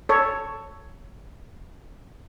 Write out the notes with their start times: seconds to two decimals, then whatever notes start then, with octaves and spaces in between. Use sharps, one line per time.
0.09 A4 C#5